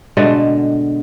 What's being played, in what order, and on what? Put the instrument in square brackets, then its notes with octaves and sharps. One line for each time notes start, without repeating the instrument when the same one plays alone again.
[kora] B2 D3 G#3 A3